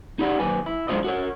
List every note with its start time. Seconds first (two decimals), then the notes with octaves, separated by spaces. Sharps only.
0.19 D#4 G4 D5 F#5 B5
0.39 D#2 A#2 F#3 B4 G#5
0.66 E4
0.88 F#3 G#3 D4 F4 C5 D#5
1.04 F#4 A#4 C#5